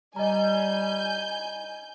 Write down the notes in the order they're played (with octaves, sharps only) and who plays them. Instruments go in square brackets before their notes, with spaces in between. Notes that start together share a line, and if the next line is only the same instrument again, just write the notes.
[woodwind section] G3 [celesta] D#5 A#5 [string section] G#5 G6